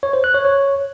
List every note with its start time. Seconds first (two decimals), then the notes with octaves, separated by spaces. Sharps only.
0.03 C#5
0.13 C5
0.24 F#6
0.34 C#5
0.45 C#5